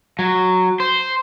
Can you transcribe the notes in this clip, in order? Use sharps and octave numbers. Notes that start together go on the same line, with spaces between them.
F#3
C5